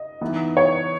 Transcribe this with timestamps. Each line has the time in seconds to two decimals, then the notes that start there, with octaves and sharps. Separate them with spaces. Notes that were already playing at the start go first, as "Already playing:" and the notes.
Already playing: D#5
0.21 E3 B3 D#4
0.57 C#5